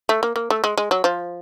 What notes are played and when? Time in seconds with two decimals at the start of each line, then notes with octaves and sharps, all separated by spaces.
0.09 A3
0.23 A#3
0.36 A#3
0.50 A3
0.64 G#3
0.78 G#3
0.91 F#3
1.04 F3